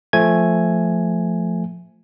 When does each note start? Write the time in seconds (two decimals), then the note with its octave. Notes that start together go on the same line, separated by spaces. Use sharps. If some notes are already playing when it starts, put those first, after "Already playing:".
0.13 F3 A3 G#5 G#6